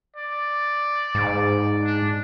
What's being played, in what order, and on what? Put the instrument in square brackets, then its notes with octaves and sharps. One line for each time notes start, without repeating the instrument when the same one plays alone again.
[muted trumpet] D5
[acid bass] G#2
[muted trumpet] D4